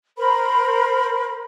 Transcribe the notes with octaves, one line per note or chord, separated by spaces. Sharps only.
A#4 C5 B5